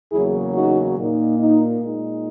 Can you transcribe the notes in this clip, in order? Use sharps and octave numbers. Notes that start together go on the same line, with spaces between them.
E2 C#3 F#3 A#3 E4 G#4
D#4 F#4
A#2 A#3 D#4
D#4
A#2 G#3 D#4